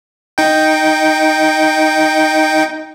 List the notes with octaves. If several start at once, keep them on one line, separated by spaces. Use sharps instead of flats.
D#4 G5